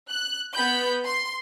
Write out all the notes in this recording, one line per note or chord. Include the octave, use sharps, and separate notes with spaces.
F#6
B3 B5 G6
C6